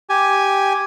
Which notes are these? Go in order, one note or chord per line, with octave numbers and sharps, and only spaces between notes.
G4 G#5